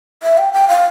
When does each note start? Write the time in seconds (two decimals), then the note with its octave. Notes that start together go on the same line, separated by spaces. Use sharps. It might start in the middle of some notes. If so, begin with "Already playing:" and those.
0.23 E5
0.38 G5
0.53 G5
0.68 F5